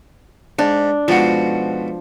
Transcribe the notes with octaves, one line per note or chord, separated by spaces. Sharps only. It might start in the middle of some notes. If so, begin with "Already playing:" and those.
G#2 D4
G#2 B2 F3 F#4